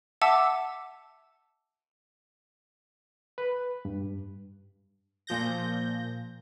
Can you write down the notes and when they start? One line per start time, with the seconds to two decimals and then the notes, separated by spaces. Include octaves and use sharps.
0.22 E5 F#5 A5 D6 E6
3.38 B4
3.85 G2
5.27 A#2 F3 G6 A#6